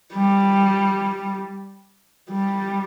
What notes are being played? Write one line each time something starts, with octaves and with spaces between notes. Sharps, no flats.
G3
G3